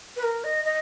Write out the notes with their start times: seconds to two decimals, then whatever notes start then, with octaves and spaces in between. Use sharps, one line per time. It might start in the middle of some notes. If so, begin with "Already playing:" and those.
0.16 B4
0.23 A#4
0.44 D#5
0.65 D#5